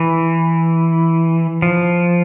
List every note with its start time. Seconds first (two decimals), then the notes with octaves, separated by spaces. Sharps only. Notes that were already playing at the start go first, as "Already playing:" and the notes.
Already playing: E3
1.62 F3